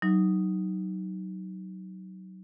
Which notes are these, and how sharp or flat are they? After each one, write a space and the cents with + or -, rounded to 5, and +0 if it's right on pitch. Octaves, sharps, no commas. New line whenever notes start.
F#3 +20 D#4 +0